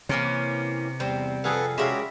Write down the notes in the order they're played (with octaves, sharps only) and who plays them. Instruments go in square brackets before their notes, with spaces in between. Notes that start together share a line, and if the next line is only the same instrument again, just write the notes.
[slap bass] C3 [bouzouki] E3 A#3 C#4
[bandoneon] E2 [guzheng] G3 [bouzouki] C4
[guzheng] F2 G#4 F5 [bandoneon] A4 B4 F#5
[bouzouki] G#3 A#4 F5 [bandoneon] C#4 F#4 G4 [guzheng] E5 B5